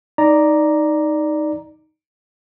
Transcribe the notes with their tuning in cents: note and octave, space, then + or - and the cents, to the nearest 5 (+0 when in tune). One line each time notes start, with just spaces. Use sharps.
D#4 +0 D5 +0 A#5 +0